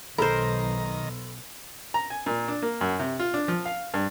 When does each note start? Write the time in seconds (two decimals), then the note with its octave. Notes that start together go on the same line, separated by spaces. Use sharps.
0.18 B1 D#3 A4 A#4 C5 A#5 B5
1.94 A#5
2.10 G#5
2.26 A#2
2.48 D4
2.62 A#3
2.81 F#2
3.00 C3
3.19 F4
3.34 D4
3.48 F3
3.66 F5
3.94 G2